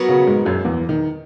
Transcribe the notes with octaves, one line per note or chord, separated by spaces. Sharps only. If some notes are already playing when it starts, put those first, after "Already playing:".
Already playing: F#3 B3 F#4 A#4 C#5
C#3 C#4
G#2 G#3
F#2 F#3
E2 E3
D#3